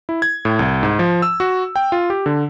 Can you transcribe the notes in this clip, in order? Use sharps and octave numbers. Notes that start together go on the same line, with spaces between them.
E4
G#6
A2
C2
G#2
F3
E6
F#4
G5
F4
G4
D3